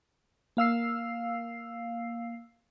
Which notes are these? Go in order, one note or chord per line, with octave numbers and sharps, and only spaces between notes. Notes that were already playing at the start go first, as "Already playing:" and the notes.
A#3 F5 E6 C7